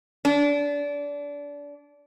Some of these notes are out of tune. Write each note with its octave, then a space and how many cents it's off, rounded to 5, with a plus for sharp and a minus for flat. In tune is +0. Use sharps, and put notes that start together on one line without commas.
D4 -25